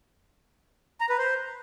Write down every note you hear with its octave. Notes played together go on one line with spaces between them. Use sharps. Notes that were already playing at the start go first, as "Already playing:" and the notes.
A#5
B4
C5